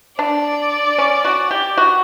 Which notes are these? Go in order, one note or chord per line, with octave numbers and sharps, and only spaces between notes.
D4 D5
C#4
F#4
G4
F#4